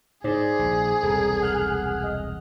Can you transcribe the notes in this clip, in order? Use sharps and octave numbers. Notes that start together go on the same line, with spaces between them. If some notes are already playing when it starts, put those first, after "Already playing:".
G#2 D#4 G#4 C5 D5
A#1
E1 C2 A4 A#4
F#5 F6 F#6
D#5